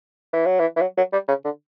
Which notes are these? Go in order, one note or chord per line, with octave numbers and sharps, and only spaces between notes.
E3
F#3
E3
E3
F#3
F#3
G3
C#3
D3